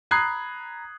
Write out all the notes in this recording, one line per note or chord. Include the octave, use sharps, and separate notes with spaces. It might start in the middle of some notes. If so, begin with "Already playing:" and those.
A#5 B5 D#6 F#6 G#6 C7